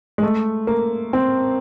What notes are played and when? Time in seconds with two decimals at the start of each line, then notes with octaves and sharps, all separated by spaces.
0.18 G#3
0.23 A3
0.67 A#3
1.13 C4